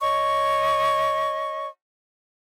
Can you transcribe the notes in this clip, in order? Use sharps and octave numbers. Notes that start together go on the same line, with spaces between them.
C#5 D#5 C#6